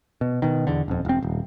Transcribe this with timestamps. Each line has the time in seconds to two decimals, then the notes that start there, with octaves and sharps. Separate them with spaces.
0.21 B2
0.42 B2 D#3
0.67 E2 D3
0.88 D#1 F2
1.05 E1 C4
1.22 D#1